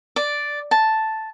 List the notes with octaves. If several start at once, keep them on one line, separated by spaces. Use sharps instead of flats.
D5
A5